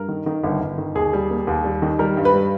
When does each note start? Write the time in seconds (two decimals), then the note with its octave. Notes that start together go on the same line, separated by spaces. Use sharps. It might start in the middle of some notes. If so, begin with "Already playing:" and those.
Already playing: G2 A#4
0.08 D#3
0.26 D#3
0.44 G1
0.61 G1
0.78 D#3
0.95 D#2 G#4
1.13 G3
1.30 A#3
1.47 D#2
1.64 G3
1.82 D#3
1.99 G3 A#4
2.17 G2
2.25 B4
2.34 G3